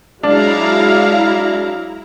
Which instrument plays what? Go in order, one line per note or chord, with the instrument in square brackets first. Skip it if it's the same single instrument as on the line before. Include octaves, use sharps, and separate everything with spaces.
[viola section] F#3 G#3 F5 [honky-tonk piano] D4 [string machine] E4 A#5